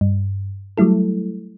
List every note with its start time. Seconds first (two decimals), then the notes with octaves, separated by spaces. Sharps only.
0.01 G2
0.78 F#3 G3 A3 E4 A4